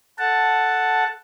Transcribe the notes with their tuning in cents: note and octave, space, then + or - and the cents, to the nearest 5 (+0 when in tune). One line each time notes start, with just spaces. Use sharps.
A4 +0 F#5 +0 A5 +0